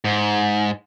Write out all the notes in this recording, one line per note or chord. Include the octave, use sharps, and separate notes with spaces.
G#2